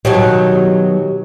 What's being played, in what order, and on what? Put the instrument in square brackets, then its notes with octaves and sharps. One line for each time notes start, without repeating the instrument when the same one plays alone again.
[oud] B2 D#3 F#3 [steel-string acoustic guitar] G4 C#5 D#5